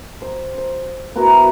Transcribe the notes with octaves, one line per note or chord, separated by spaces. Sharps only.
C5
C5
B3 E4 F#4 A#4